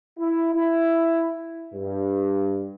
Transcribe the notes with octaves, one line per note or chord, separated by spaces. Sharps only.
E4
E4
G2